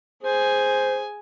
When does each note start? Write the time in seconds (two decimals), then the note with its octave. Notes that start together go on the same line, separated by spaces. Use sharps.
0.23 G#4 C5 G#5